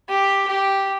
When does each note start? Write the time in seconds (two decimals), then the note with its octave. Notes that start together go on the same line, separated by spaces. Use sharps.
0.09 G4
0.48 G4